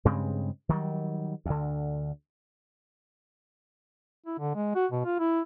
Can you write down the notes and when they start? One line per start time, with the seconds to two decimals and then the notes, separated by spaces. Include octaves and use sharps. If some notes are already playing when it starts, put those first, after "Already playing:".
0.05 G2 C#3 G#3 C4
0.69 D#3 F#3 G3
1.46 D2 D3
4.26 E4
4.39 D3
4.55 G#3
4.75 F#4
4.92 B2
5.05 F4
5.19 E4